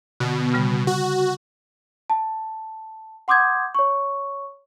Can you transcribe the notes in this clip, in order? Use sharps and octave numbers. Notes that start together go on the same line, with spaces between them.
B2 D3
C#3 G3 B5
F#4
A5
F#5 C6 D6 D#6 G6 G#6
C#5 C#6